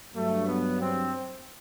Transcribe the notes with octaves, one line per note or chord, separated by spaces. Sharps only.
G2 F#3 A3
B3
C4